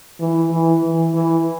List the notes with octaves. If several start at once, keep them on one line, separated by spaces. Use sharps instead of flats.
E3
E3
E3
E3